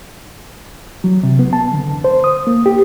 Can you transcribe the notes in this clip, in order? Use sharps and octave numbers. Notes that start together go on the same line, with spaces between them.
F#3
C3
B3
A5
D3
E2
C5
D#6
A#3
G4